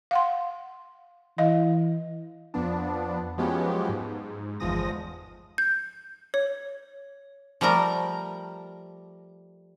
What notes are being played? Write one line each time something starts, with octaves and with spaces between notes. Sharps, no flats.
F5 F#5 C6
E3 D#5 F5
F2 F3 B3 D4
F3 F#3 G#3 B3 C#4 G4
G#2
G1 E2 F3 G#3 D#6 A#6
G6
C#5
F3 G3 A3 A#4 A#5